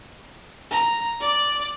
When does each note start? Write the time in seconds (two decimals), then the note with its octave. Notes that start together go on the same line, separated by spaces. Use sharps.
0.71 A#5
1.21 D5